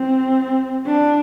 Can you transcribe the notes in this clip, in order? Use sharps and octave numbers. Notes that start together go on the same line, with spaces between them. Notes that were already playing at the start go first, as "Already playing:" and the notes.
Already playing: C4
D4